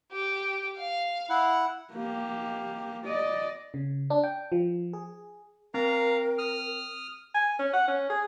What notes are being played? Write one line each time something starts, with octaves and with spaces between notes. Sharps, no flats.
G4
F5
E4 F#5
A#3 G4
D5 D#5
C#3
D4
G5
F3
G#4
C4 A#4 F5 A#5
D#6 F6
G#5
C#4
F#5
C#4
G#4